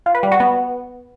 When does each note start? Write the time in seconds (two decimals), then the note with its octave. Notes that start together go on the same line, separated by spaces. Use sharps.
0.06 F4
0.15 B4
0.23 G3
0.32 F#4
0.40 B3